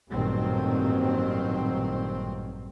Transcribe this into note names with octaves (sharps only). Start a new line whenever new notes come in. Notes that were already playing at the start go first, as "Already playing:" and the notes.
A1 G2 A#2 D#3 F#3 C4